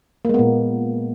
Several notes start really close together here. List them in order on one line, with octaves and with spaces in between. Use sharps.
A#3 G#3 B3 A#2